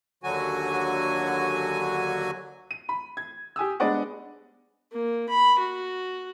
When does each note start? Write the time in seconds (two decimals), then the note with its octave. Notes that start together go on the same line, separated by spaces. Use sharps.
0.23 D#2 D3 F#3 F#4 G#5
2.71 D#7
2.89 B5
3.17 G#6
3.56 G4 G#5 D#6 E6
3.80 G#3 B3 D4 D5 D#5 F#5
4.92 A#3
5.29 B5
5.59 F#4